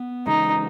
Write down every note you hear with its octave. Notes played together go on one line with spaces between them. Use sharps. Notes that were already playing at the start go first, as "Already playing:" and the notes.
Already playing: B3
C#3 E3 G#3 C#4 D#4